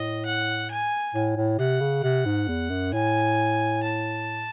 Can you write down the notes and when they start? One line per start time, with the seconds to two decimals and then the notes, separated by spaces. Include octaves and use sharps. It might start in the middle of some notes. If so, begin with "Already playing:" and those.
Already playing: A2 D#5
0.25 F#5
0.70 G#5
1.14 A2
1.36 A2
1.59 C3 F#5
1.80 C#3
2.03 C3 F#5
2.26 G#2
2.48 E2
2.70 F#2
2.93 A2 G#5
3.82 A5